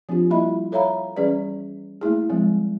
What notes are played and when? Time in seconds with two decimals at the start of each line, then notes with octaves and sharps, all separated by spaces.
0.09 F3 C4 D4 F4 G4
0.30 G3 A#3 E4 D#5 E5 B5
0.72 A4 C#5 E5 F5 A#5 B5
1.16 E3 G3 C#4 G#4 B4 D5
2.01 A3 A#3 E4 G#4
2.30 F3 G3 G#3 C4